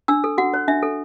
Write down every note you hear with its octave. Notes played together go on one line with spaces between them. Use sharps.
D4 E6
A4
F#4 F#5
C#5
D4 E5
A4